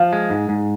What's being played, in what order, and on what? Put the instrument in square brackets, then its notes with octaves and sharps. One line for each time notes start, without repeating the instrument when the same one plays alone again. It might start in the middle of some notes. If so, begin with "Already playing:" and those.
Already playing: [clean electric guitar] F3 [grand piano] F5
[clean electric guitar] G#3
G#2
G#2